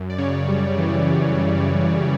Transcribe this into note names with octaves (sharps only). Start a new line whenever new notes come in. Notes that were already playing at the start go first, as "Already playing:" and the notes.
Already playing: F#2
D5
C#3 C#5
G3
E3
F#2
C#3